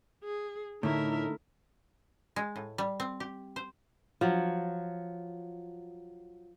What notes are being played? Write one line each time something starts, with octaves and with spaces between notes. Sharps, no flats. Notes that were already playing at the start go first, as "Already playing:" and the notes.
G#4
A2 D3 A3 D#4 E4 A#4 E5
G#3
A2
G3
C4
G4
C5
F3 F#3